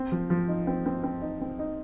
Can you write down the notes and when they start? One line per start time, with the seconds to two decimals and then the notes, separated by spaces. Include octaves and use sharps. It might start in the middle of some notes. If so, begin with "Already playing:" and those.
Already playing: C4
0.12 F3
0.30 F3
0.48 D#4
0.67 C4
0.86 C4
1.03 C4
1.22 D#4
1.41 C4
1.59 D#4